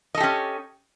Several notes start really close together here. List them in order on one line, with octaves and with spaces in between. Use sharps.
D#5 A4 G4 C#4